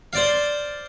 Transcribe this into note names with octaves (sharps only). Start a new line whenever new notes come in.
C5 D5 F5